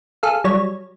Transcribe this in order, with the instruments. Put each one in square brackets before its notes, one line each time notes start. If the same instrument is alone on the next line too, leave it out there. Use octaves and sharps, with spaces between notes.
[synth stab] G#4 A4 F5
F#3 G3 C#5